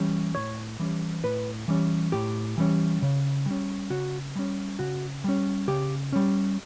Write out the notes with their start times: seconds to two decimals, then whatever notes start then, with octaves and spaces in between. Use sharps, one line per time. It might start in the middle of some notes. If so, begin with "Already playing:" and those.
Already playing: E3 G3 C#4
0.35 A2 C#5
0.79 E3 G3 C#4
1.23 A2 B4
1.68 E3 G3 C#4
2.12 A2 G4
2.58 E3 G3 C#4
3.02 C#3
3.46 G3 C#4
3.90 C#3 F#4
4.36 G3 C#4
4.79 C#3 F#4
5.24 G3 C#4
5.68 C#3 G4
6.12 G3 C#4